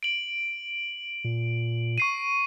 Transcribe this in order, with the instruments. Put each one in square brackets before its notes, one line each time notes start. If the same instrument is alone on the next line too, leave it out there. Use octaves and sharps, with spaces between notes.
[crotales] D7 F#7
[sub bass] A#2
[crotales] C#6 C7 D#7